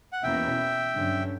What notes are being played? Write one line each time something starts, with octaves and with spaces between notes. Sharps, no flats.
F#5
E2 B2 A#3 C#4 E4 E5 G5
G2 D3 F#3 C#4